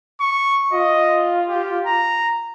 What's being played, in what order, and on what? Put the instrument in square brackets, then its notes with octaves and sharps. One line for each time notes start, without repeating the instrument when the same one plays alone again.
[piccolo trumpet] C#6
[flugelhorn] F4 [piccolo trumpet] D#5
[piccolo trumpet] G4
A#5